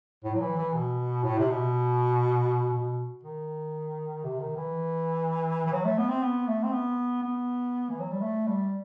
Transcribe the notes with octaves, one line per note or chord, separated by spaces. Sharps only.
A2
F#3
E3
E3
B2
A2
C3
B2
B2
D#3
C3
D#3
E3
E3
F#3
A3
B3
C4
B3
A3
C4
B3
B3
E3
F#3
G3
A3
G3